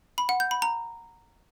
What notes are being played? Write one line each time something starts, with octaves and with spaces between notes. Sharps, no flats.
B5
F#5
G6
B5
A#5